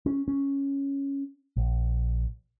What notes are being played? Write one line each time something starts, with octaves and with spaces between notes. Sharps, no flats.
C#4
C#4
A#1